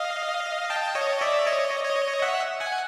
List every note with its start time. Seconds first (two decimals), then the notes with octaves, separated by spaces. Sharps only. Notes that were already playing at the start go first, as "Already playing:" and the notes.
Already playing: D#5 F5
0.70 G5 A5
0.95 C#5 D#5
1.21 D5 E5
1.47 C#5 D#5
1.84 C#5 D#5
2.22 E5 F#5
2.60 F#5 G#5